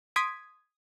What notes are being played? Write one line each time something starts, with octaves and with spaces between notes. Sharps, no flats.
C6 D#6 G#6 B6 D7